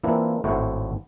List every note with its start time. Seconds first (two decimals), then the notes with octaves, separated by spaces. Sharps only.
0.04 E3 A#3 C4 D4 E4 F4
0.44 G#1 A2 A3 E4 F#4 C5